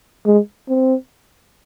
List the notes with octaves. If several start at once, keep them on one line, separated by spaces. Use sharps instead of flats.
G#3
C4